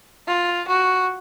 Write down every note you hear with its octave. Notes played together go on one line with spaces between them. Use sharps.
F4
F#4